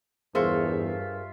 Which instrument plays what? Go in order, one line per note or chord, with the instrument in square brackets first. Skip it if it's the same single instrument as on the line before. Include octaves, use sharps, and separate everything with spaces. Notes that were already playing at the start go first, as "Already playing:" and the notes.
[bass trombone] E2 [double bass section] G2 [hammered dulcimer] F4 E5 C#6 [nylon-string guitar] G#4 A#4 C5